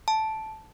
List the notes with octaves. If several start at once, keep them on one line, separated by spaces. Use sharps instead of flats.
A5